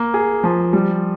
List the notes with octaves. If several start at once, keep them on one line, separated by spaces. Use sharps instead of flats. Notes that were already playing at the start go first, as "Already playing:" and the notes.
Already playing: A#3
G#4
F3
G3